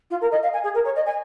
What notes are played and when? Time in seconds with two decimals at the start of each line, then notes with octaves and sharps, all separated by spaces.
0.10 F4
0.21 A#4
0.32 D#5
0.43 F5
0.53 G#5
0.64 G#4
0.75 A#4
0.85 C#5
0.96 D#5
1.06 G#5